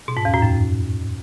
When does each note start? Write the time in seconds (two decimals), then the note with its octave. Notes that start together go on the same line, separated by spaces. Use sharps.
0.08 B2
0.17 G#2
0.25 E2
0.34 A2
0.42 F#2